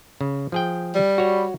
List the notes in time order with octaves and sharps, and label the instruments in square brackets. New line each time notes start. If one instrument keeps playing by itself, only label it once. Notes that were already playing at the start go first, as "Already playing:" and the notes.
[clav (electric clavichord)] C#3
F3 G#4 G5
[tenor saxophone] G3
[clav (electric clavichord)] F#4 C#5